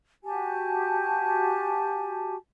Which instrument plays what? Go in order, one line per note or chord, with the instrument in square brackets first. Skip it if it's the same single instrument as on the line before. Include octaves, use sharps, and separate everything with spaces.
[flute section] F#4 G4 G#5 A5